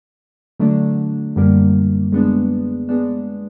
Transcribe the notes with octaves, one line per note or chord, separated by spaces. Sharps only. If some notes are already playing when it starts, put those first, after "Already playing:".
D3 F#3 A3 D4
F#2 D3 G3 A#3
G#3 B3 D4
G#3 B3 D4